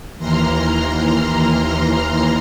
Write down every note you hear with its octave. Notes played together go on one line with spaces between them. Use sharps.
D#2 E3 A#5 C6 F6